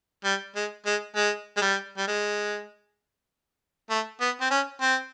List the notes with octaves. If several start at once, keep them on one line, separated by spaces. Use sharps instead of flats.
G3
G#3
G#3
G#3
G#3
G3
G3
G#3
A3
B3
C4
C#4
C4